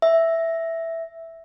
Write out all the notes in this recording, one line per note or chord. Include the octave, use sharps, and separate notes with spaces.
E5